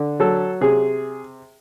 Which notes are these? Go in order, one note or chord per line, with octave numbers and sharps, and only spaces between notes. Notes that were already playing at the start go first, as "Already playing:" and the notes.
Already playing: D3
F#3 A4
C3 G#4